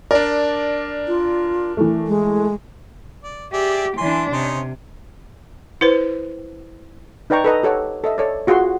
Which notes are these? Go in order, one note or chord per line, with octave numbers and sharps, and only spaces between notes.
D4 A#4 D5
F4
E3 A3
G#3
D5
G4 G#4 D5 E5
E3 D4 G#5 C6
C3 C#4 D#4 C6
E4 B4 C5
D#4 B4 D5 G5 A#5 C#6
A4 B4 D#5 A#5
G4 A4 C#5 F#5
A4 D#5 E5
A4 C#5 D5
F4 F#4 G#4 F#5 C6